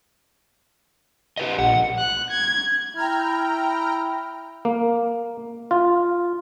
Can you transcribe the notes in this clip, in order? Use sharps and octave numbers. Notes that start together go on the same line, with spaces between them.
G4 B4 D#5
A#1 F#5
F#6
G#6
E4 G5 A#5 F6
A#3
F4